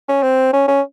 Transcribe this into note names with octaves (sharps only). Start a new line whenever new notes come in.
C#4
C4
C#4
C#4